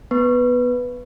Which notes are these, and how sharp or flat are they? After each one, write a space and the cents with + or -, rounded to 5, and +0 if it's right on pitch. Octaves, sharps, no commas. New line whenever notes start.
B3 +0 B4 +0